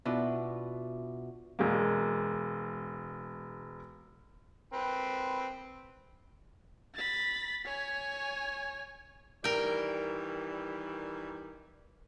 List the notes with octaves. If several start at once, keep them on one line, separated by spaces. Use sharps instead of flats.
B2 D4 E4 F4
E1 G#3 A#3
C4 B4
B5 A6
C#5 G#5
D#3 E3 G3 A#4 G5